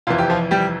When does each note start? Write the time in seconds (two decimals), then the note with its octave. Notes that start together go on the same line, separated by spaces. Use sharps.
0.07 F1 F2 E3 F4
0.18 G4
0.30 F3 F4
0.51 G3 G4